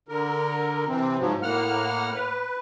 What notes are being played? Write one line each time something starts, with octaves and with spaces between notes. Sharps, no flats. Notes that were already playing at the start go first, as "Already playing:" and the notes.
D3 A#4
C3 E3 C4
G#2 F3 F#3
A2 A#3 F#5 F6
B4